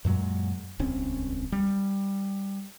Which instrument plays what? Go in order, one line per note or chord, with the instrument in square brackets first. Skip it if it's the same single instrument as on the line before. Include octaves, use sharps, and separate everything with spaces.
[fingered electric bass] F#2 A#2 F#3 G#3
D#1 C#2 C4 C#4
G3